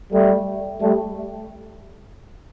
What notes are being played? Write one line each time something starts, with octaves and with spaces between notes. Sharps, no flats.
G3 A3
G3 A3